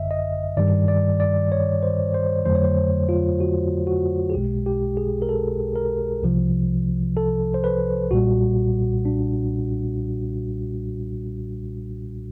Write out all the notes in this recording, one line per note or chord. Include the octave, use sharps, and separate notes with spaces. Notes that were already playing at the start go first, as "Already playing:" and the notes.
Already playing: G#1 F#2 D3 D#5 E5
D#5
G2 D#3 G3 D5
D5
D5
C#5
C5
C5
F2 D3 F#3 A3 C5
C#5
C5
F4
F#4
F#4
G#4
B1 B2 G#3 G4
G4
G#4
A#4
A4
A#4
C2 C3 F3
A4
C5
B4
B1 A#2 G3 F#4
D4